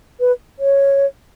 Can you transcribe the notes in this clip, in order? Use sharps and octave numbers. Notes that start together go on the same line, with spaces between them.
B4
C#5